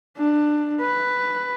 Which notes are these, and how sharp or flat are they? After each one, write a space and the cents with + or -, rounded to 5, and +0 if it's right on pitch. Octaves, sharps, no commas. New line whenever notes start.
D4 +20
B4 +5